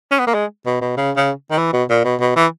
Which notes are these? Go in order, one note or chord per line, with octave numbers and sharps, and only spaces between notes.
C#4
B3
A#3
G#3
B2
B2
C#3
C#3
D#3
E3
B2
A#2
B2
B2
E3